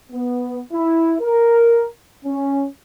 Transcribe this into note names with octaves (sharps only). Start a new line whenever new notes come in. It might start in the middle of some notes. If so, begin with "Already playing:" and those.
B3
E4
A#4
C#4